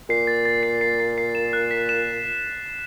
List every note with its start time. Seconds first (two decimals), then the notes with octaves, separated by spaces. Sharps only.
0.09 A#2 C7
0.27 A6
0.45 A6
0.63 C7
0.81 C7
1.00 C7
1.18 C7
1.35 E7
1.53 F#6
1.71 B6
1.89 E7